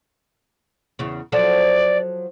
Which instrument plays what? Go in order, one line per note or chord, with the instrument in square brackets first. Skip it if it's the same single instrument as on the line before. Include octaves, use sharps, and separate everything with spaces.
[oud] E2 C#3
[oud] F3 F#3 A4 [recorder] D5